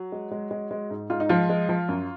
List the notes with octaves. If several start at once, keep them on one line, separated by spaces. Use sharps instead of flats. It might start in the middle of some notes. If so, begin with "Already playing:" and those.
Already playing: F#3
G#3
G#3
G#3
G#3
G#2
G#2 F4
D#4
F3 G#3 F4
G#3
F3
F#2